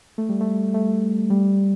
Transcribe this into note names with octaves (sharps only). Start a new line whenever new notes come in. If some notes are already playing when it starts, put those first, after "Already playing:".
A3
G3
A3
A3
G3